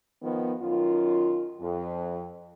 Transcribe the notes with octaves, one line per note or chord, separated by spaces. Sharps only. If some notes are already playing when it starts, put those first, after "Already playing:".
D#3 F3 B3
F#2 D#3 F4
F2